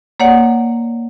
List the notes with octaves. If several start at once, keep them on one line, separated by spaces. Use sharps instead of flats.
A#3 C#5 D5 F#5